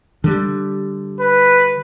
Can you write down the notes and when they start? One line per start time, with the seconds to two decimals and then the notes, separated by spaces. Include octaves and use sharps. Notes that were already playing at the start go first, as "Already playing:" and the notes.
0.24 D3 G3
1.20 B4